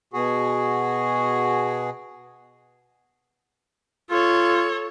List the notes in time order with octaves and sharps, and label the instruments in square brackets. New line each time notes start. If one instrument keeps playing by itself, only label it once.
[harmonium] B2 F#4 G#4
[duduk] F4 [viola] A4 C#5